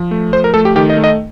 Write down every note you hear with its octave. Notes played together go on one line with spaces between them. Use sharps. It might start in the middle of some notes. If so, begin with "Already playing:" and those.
Already playing: F3
A3
F3 C5
A#4
A3 A4
G4
D#3 G4
D#5
A3
D#5